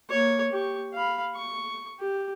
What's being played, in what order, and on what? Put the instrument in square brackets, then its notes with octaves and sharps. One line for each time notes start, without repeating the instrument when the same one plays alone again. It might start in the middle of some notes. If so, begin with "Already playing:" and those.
[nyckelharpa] A#3 C#5
G4 C#6
F5 B5
C#6
G4